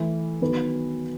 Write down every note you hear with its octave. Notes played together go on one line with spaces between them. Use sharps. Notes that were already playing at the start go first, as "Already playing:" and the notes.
Already playing: E3 A3 E4
D#3 F#3 B3 F#4 B4